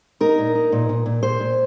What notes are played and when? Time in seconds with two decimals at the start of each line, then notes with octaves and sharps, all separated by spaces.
0.21 D#4 A#4
0.38 A#2
0.55 D#4
0.72 A#2
0.89 A#2
1.06 A#2
1.23 A#2 C5
1.40 A#2